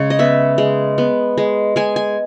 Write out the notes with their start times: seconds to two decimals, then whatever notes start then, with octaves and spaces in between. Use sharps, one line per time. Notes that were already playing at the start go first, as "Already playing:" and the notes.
Already playing: C#3 G#3 C#5
0.10 D#5
0.19 B3 E5
0.58 G#3
0.98 B3
1.38 G#3
1.76 G#3 G#5
1.96 G#5